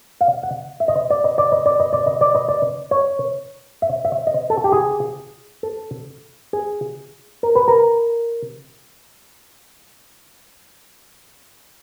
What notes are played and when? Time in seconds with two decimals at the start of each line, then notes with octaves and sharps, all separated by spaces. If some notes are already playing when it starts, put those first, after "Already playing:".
0.21 F5
0.43 F#5
0.80 E5
0.88 D#5
1.10 D5
1.24 D#5
1.38 D5
1.52 D#5
1.66 D5
1.80 D#5
1.93 D5
2.06 D#5
2.21 D5
2.35 D#5
2.48 D5
2.91 C#5
3.82 E5
4.05 E5
4.27 D#5
4.50 A4
4.64 G4
4.72 G#4
5.63 A4
6.53 G#4
7.43 A#4
7.55 B4
7.68 A#4